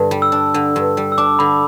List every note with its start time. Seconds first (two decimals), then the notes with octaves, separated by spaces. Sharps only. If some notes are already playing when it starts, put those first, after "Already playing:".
Already playing: G2 D3 D4
0.11 G3
0.22 E6
0.32 D4
0.54 D3
0.76 G2
0.97 G3
1.12 E6
1.18 D4 D6
1.39 D3 B5